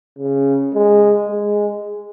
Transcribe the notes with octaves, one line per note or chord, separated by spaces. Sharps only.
C#3
G#3
G#3